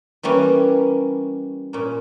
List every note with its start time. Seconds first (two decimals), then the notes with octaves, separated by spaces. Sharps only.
0.23 E3 G3 A#3 C#4
1.73 A#2 A#3 C#4